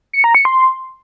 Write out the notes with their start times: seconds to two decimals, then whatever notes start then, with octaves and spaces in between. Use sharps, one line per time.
0.13 C#7
0.24 A#5
0.35 C#7
0.45 C6